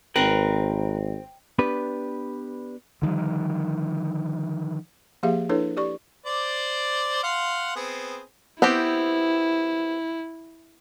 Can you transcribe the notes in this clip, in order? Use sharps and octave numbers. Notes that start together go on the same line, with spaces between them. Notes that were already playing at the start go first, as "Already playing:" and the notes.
G#1 C4 A#4 B4
B3 D4 G4 B4
D3 D#3 F3 G3
F3 A#3 G4 G#4 E5 F5
D4 E4 A4 B4 C#5
G4 D5 C#6
C5 D5 D6
F5 F#5 C6
B3 C4 G#4
B3 C4 E4 G4